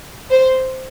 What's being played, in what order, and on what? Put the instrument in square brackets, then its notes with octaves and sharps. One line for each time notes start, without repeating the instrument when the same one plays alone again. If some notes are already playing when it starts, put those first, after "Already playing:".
[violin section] C5